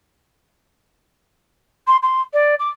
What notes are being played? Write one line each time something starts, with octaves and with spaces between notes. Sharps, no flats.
C6
C6
D5
D6